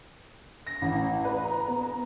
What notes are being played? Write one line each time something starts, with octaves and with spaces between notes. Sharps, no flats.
A#6
A1
B4
A#5
B3
A#5